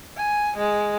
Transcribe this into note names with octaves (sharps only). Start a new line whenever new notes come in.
G#5
G#3